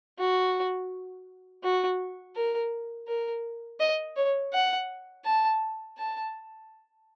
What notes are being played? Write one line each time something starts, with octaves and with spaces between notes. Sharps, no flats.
F#4
F#4
A#4
A#4
D#5
C#5
F#5
A5
A5